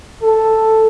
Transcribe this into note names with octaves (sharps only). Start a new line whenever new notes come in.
A4